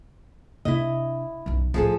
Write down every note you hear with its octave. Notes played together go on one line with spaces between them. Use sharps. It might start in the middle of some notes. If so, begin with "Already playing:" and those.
C3 D4 E4 D#5
B1 F#2
A1 A2 F3 G#4 A4